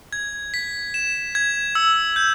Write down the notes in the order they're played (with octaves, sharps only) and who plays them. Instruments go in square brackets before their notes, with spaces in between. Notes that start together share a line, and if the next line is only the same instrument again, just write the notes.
[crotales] G#6
B6
E7
G#6
E6
G6